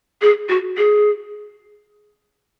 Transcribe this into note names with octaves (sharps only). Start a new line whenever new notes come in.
G#4
F#4
G#4